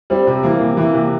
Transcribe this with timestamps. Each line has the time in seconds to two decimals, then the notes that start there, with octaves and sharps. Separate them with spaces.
0.10 G3 C4
0.27 C3
0.43 E3 A#3
0.60 C3
0.77 E3 A#3
0.94 C3